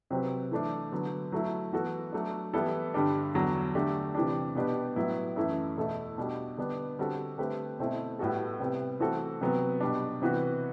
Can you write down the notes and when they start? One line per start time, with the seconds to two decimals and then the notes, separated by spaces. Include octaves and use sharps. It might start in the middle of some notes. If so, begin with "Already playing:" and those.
0.10 C3 F#3 C4 G4 B4
0.51 E3 A3 D4
0.92 D3 F#3 B3
1.32 F#3 A3 E4
1.72 E3 B3 F#4 A4
2.12 F#3 A3 D4
2.53 E3 G3 B3 E4 A4
2.94 G2 D3 G3 D4
3.34 E2 D3 F#3
3.75 D3 A3 D4 G4
4.15 C3 E3 G3 D4
4.55 B2 G3 B3 D4 G4
4.96 A2 F#3 B3 E4
5.36 F#2 E3 A3 E4
5.77 E2 B2 A3 E4 A4
6.18 B2 G3 D4 F#4
6.57 D3 G3 B3 D4
6.99 D3 G3 C4 F#4 A4
7.38 D3 A3 C4 G4 B4
7.79 B2 A3 C4 E4
8.19 A2 G3 B3 F#4 A4
8.60 C3 G3 B3
9.00 E3 A3 C4 F#4 A4
9.41 C3 F#3 B3
9.81 B2 G3 D4
10.22 C3 E3 B3 F#4 B4